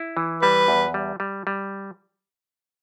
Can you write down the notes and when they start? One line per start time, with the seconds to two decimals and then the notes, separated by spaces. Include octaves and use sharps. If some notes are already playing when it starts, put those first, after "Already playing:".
Already playing: E4
0.17 E3
0.42 G3 B4
0.68 E2
0.94 G3
1.20 G3
1.47 G3